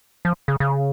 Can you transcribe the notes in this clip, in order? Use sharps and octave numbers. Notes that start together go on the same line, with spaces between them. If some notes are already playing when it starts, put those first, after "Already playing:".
F3
C#3
C#3